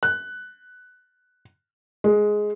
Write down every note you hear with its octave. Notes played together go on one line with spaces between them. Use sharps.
F#6
G#3